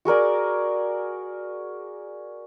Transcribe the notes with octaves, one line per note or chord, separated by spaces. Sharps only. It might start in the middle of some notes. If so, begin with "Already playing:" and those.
F#4 G#4 A#4 D5